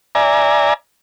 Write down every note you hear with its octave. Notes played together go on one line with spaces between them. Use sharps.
D5 E5 G#5 A#5